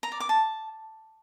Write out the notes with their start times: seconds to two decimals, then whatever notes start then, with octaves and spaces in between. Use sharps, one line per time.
0.03 A#5
0.12 D5
0.20 D6
0.29 A5